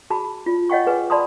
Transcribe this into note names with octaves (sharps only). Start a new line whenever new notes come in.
F#4 G#4 A5 B5
F4
C#5 D#5 F#5 G5 C#6
G#4 B4 G#5
D5 A5 B5 C6 D#6